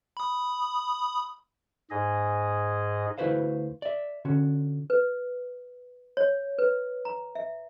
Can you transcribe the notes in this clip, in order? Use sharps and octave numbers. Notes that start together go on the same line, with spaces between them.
B5 D#6
G#2 G#4 D#5
D2 E4 F#4 B4 C5 F5
D5 E5
D3 C#4 F#4
B4
C#5
B4
A#5
E5